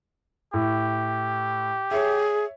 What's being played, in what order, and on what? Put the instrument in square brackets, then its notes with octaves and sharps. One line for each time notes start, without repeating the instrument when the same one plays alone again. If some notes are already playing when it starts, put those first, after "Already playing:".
[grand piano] A2 [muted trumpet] G4
[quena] G#4 [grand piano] C#5 E5